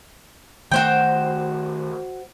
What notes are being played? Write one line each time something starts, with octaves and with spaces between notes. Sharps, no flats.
D#3 A3 F#4 C5 G5